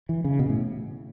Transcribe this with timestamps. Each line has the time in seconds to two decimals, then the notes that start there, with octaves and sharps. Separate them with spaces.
0.09 E3
0.24 C#3
0.39 B2
0.49 A2